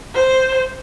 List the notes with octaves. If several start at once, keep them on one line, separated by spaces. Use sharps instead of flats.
C5